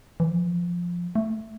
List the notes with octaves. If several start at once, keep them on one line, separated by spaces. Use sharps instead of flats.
E3
F3
A3